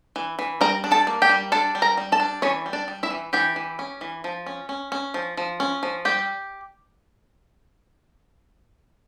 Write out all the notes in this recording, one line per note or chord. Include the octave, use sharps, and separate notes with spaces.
E3
E3
G3 A#4 A#5
D4
A4 A5
A#3
G4 G5
G3
D4 A4 A5
G3
A#4 A#5
G3
A4 A5
D4
E3 C#4 C#5
G3
D4 D5
G3
E4 E5
E3
E3 G4 G5
E3
C#4
E3
F3
C#4
C#4
C#4
F3
F3
C#4
F3
G3 G4 G5